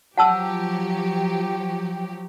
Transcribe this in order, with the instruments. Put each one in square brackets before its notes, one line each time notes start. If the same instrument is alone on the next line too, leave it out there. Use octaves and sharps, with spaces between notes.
[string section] F3 F#3 G4 [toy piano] F#5 A5 E6